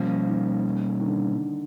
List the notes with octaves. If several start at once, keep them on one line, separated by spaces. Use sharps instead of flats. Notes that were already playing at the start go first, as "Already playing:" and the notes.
Already playing: B2 F3 G3 A#3 C#4
D#3
D#3
D3